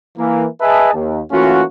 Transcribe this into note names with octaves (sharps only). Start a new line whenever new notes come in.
E3 A#3
G#4 B4 D#5 E5 G#5 A5
D#2
E3 A3 A#3 C#4 F4 F#4